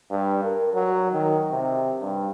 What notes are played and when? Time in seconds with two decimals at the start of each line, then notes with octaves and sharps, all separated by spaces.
0.11 G2
0.44 A#4
0.74 F#3
1.12 D#3
1.51 C3
2.01 G2